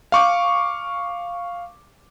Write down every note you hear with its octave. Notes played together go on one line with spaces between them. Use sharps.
F5 C#6 D6